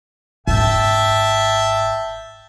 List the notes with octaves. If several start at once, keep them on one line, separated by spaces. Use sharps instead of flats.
G#1 E5 G5 A5